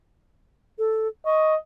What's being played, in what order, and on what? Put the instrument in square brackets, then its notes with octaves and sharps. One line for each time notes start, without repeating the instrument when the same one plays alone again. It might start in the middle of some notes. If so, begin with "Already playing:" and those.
[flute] A4
[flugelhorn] D#5 [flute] C#6